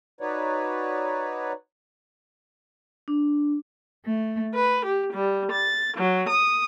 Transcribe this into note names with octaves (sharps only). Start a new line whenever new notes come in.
D#4 F#4 B4 C#5 D5
D4
A3
B4
G4
G3
A6
F#3
D#6